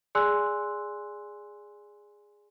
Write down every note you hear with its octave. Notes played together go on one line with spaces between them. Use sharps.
G#4 D5 G#5 C6 E6 F#6